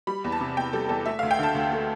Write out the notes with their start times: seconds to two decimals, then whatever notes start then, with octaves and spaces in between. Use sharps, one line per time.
0.07 G3 B5
0.24 E2
0.32 A5
0.40 C3
0.57 E2 G5
0.73 G3 A4
0.89 E2 A4
1.06 A3 E5
1.19 D2 F5
1.31 G5
1.39 D3 A5
1.55 D2
1.72 A3